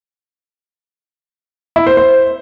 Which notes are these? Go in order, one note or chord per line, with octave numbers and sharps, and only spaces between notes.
E4
C5
C5